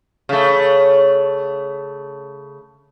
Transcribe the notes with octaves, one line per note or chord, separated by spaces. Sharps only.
C#3 A3